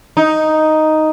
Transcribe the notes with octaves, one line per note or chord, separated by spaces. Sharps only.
D#4